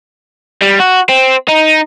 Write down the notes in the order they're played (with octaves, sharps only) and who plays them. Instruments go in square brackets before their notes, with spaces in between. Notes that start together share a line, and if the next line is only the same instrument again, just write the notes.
[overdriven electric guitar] G3
F#4
C4
D#4